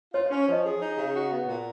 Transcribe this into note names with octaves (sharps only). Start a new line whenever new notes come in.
F4 C#5
C#5
C#4
C#5
F3 D#5
G#4
D#4
C#3
F#4
B3
A#2